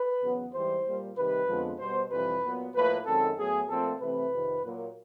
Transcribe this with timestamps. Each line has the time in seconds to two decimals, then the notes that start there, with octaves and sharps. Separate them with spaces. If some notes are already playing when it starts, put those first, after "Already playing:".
Already playing: B4
0.20 E2 C#3 F#3 B3
0.53 G#2 E3 G3 C5
0.85 A#2 G3 A#3
1.16 C3 D#3 G3 B4
1.47 F2 D3 F3 G#3 B3
1.79 B2 G3 B3 C5
2.10 F2 C3 E3 G3 B4
2.43 A#2 F#3 B3
2.74 A2 F3 A#3 B4
3.05 F#2 D#3 G#3 C4 A4
3.37 A2 F#3 B3 G#4
3.69 A#2 F3 A3 C4 A4
4.00 C3 E3 A3 C4 B4
4.32 F2 C3 D#3
4.64 A#2 F#3 A#3